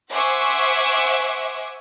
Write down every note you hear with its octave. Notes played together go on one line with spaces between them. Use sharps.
C5 E5 F#5 G#5 C#6 D6